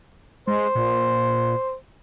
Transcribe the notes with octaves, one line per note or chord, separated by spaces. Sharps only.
G#3 C5
A#2